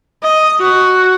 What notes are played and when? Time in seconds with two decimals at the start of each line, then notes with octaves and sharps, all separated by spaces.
0.23 D#5
0.60 F#4